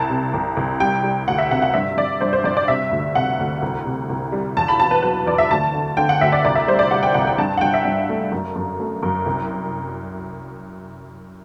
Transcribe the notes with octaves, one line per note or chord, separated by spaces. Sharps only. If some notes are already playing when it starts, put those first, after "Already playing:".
Already playing: C2 A5
C3
C2
C2
G3 G5
G3
D2 F#5
E5
C3 F#5
F#5
G2 E5
G2 D5
G2 C5
C5
G2 D5
D5
C3 E5
D2
C3 F#5
D2
C2
C3
C2
G3
E2 A5
B5
B2 A5
B4
F#3 B4
E2 D5
E5
D2 A5
D3
D3 G5
F#5
D2 E5
D5
C2 D5
E5
G3 C5
D5
G3 F#5
G5
C2 F#5
G5
G2 A5
F#5
G2 G5
E5
G2
A3
F#2
F#2
A3
F#2
C2